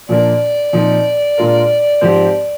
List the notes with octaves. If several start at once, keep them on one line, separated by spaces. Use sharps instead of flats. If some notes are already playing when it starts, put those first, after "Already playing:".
A#2 F3 A#3 D4 D5
A#2 F3 C4 D#4
A#2 G#3 D4 F4 A#4
G#2 F3 C4 G4 C5